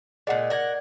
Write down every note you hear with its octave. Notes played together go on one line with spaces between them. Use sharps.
A#2 G#3 D5 F#5
A#4 D5 F#5 G#6